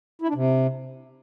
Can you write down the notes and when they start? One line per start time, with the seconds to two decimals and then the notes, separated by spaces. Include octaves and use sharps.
0.22 E4
0.28 D4
0.35 C3